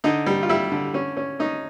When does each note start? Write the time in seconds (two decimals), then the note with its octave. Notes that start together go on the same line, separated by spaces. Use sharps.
0.04 D3 D#4
0.26 G3
0.42 F4
0.49 G3 E4
0.72 D3
0.94 C#4
1.17 C#4
1.39 C#4 D#4